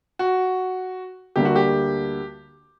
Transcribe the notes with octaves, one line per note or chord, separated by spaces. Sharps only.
F#4
D2 D3 G3 A#3 G4
F#4
G4